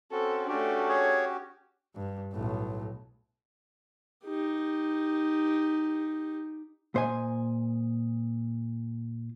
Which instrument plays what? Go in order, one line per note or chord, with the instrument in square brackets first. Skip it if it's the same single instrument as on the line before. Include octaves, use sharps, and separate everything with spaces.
[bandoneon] C4 C#4 F#4 [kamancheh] A4
[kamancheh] A3 D4 [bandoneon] C#4 F#4 G4
[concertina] G#4 C#5
[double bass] G2
B1 A2
[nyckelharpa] D#4 G4
[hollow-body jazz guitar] A#2 C5 D#5 G#5